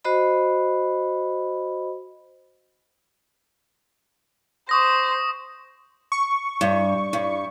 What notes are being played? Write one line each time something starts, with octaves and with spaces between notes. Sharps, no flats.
F#4 C5 D#5 B5
C5 C#6 D#6 A#6
C#6
G2
G2